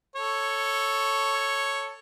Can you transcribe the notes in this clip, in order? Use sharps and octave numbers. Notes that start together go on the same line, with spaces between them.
A4 C#5